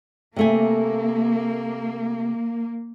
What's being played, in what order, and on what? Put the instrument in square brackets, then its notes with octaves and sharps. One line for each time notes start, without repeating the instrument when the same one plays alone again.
[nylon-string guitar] C3 A3 G#5 [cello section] A#3